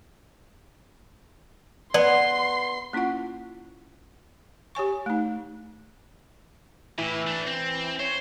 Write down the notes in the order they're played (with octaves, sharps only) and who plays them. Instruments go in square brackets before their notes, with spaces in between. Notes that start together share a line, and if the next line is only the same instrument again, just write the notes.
[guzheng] B3 [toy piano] D5 [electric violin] C6 C7
[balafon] A#3 C#4 E4 F4 F#5
G4 C#5 G#5 C#6
A3 D#4
[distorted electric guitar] A2 [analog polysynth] E3
[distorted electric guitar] A3 D4
C4
[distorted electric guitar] C5 [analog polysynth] C#5